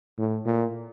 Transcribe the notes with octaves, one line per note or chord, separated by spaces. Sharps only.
A2
A#2